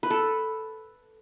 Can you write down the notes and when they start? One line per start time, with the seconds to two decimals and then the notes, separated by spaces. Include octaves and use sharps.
0.03 B4
0.10 A4